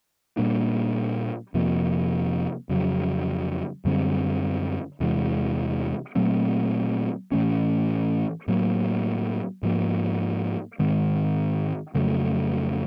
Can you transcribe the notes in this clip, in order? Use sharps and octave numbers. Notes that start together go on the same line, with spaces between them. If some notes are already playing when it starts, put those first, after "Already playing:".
A#2 G3 A#3 D4
F2 C3 F3 A#3
F2 C#3 F#3
F#2 D3 G3 C4
E2 C3 E3 G#3
A#2 F#3 A3 C4
A2 E3 A3 C#4
A2 F#3 A#3
G#2 F3 A#3
G#2 D#3 G#3 C4
F2 C#3 F#3 A3